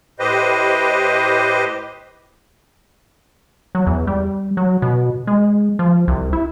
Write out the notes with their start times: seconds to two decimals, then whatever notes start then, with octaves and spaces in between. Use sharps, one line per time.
0.19 A2 G4 B4 C5 D#5
3.75 F#3
3.87 E2
4.07 G3
4.57 F#3
4.82 B2
5.27 G#3
5.79 F3
6.08 C2
6.33 E4